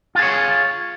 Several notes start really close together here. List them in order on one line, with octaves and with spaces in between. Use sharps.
F4 G#4 C#5